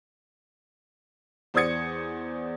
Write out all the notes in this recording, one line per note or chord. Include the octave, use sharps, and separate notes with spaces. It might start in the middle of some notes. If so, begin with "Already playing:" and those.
E2 C5 D5 D#6 G#6 C#7